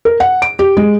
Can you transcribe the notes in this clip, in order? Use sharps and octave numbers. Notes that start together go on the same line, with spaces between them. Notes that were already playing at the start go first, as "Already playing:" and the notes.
A#4
F#5
D7
G4
G#3